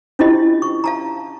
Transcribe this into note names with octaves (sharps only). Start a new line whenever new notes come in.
C#4 D4 E4 F4 G4 D#5
C#6
F5 A5 A#5